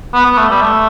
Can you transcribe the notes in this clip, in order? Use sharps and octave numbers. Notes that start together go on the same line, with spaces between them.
B3
B3
A3
G3
A3